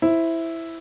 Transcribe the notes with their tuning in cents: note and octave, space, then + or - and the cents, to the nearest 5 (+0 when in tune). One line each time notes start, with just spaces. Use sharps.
E4 +0 C5 +0